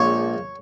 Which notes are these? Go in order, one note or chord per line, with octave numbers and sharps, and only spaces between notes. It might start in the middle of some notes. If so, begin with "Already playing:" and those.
Already playing: A#1 A#2 F3 G#3 C#5